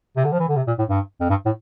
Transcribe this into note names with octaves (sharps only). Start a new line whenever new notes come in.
C3
D3
F3
E3
D3
C3
A#2
A2
G2
F2
G2
A2